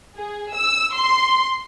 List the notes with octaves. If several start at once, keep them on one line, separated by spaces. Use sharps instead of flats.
G#4
E6
C6